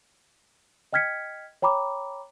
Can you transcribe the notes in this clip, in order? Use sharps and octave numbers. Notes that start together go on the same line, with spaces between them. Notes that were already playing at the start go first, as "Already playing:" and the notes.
D#5 G5 F6 G#6 B6 C#7
C#5 G5 A#5 B5 D6